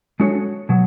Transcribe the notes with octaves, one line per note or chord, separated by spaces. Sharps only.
G#3 D4 F#4 A4 C#5
B2 F#3